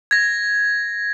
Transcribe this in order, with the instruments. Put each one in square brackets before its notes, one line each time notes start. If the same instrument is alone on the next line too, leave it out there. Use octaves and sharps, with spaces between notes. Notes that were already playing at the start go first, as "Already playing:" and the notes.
[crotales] G#6 A#6